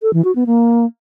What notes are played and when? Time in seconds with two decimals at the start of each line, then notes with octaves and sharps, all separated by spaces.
0.02 A4
0.13 E3
0.24 F#4
0.35 B3
0.46 A#3